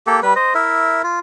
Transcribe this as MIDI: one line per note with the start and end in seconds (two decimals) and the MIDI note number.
0.07 0.20 58
0.07 0.20 67
0.07 0.20 69
0.23 0.34 55
0.23 0.34 71
0.36 0.54 72
0.36 0.54 75
0.55 1.02 64
0.55 1.02 70
0.55 1.02 76
1.04 1.19 65